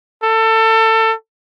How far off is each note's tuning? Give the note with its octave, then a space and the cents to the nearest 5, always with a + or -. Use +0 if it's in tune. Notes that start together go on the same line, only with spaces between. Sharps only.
A4 +25